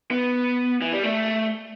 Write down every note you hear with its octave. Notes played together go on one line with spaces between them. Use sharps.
B3
E3
G3
A3